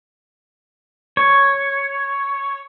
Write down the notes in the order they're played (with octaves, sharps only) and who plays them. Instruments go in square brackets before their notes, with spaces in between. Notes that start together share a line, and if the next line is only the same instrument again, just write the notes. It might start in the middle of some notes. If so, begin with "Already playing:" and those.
[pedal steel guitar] C#5